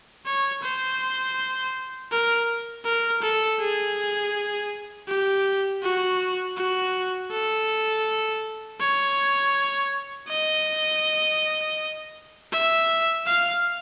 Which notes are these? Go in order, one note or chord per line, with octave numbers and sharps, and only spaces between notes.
C#5
C5
A#4
A#4
A4
G#4
G4
F#4
F#4
A4
C#5
D#5
E5
F5